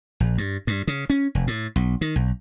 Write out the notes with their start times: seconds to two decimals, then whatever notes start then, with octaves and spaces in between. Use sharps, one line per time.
0.20 A#1
0.38 G2
0.67 G2
0.87 C#3
1.10 C#4
1.35 F1
1.47 A2
1.76 B1
2.01 D#3
2.16 B1